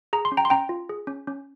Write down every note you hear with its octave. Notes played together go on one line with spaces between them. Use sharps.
G#4 A#5
C6
C#4
G5 A#5
C6
C#4 G5 A#5
F4
G#4
C#4
C#4